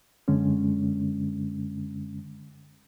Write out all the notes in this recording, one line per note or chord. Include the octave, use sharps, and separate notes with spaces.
F#2 D3 G#3 C#4